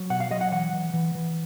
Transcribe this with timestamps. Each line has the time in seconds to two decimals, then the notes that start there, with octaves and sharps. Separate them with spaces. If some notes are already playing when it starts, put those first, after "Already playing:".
Already playing: F#3
0.10 B2 F#5
0.20 F5
0.31 F#3 D#5
0.41 F#5
0.52 E3 F#5
0.73 E3
0.94 E3
1.15 E3